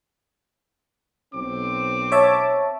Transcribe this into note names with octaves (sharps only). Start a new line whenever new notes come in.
B1 C4 D6
C#5 E5 A5